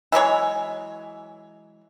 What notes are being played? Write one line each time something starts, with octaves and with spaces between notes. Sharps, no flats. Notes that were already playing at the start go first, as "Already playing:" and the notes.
E3 F#3 G#3 C#5